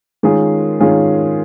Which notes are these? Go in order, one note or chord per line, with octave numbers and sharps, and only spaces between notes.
D#3 G#3 C#4 F4 G#4
D#3 G#3 C#4 F4 G#4